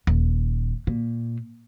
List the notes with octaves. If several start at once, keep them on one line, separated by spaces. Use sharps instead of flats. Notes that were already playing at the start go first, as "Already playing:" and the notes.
D#1
A#2